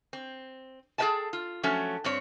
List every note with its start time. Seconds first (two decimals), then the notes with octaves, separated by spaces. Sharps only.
0.13 C4
0.98 G#4 A4 B4 E5 G5 A5
1.33 F4
1.63 F3 F#3 A3 C#4
2.04 G2 C4 C#5